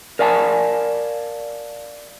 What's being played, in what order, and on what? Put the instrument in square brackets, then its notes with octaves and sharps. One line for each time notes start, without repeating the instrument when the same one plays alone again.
[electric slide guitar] A#4 D5 F5 G#5 A5